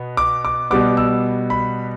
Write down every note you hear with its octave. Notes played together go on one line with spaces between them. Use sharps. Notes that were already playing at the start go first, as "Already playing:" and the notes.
Already playing: B2 B3
D6
D6
B2 G3 B3 D6
E6
B5